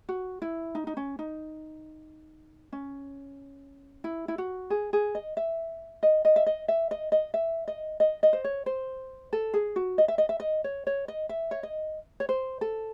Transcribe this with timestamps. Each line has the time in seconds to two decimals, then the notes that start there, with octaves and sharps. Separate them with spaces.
0.09 F#4
0.42 E4
0.75 D#4
0.87 D#4
0.97 C#4
1.19 D#4
2.73 C#4
4.04 E4
4.28 E4
4.38 F#4
4.70 G#4
4.93 G#4
5.15 D#5
5.37 E5
6.03 D#5
6.25 D#5
6.36 E5
6.46 D#5
6.68 E5
6.91 D#5
7.12 D#5
7.34 E5
7.68 D#5
8.00 D#5
8.23 D#5
8.33 C5
8.44 C#5
8.66 C5
9.33 A4
9.54 G#4
9.76 F#4
9.98 D#5
10.08 E5
10.18 D#5
10.29 E5
10.40 D#5
10.64 C#5
10.87 C#5
11.08 D#5
11.29 E5
11.51 C#5
11.63 D#5
12.20 C#5
12.29 C5
12.61 A4